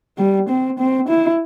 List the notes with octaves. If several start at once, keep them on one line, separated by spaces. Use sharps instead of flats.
G3
C4
C4
E4